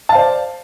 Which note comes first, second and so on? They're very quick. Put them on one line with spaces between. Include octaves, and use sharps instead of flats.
A5 F5 C5 D5